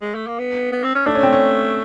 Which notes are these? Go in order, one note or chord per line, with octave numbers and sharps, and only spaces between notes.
G#3
A3
A#3
B3
B3
C4
C#4
A3 D4
C#4
C4
C#4